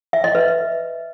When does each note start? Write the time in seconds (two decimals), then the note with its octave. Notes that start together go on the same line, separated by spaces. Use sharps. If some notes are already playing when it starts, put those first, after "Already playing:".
0.13 E5
0.24 D#5
0.35 B4